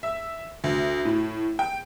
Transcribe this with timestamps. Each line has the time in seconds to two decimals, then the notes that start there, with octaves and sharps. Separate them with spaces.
0.03 E5
0.64 D2
1.05 A2
1.59 G5